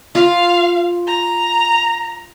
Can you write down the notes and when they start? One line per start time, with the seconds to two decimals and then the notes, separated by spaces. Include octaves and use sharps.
0.15 F4 F5
1.07 A#5